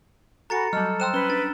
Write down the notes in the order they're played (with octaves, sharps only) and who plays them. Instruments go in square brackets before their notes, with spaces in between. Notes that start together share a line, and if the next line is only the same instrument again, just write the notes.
[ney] F#4 [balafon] A4 G#5 B5 [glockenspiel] A#5 A6 C#7
[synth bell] F#3 G3 [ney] A4 [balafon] D#5 A5 [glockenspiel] F6
[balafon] C5 G5 C6 [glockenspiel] E6 F#6 E7
[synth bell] C#4 G7 [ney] B4
[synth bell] D4 [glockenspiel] A6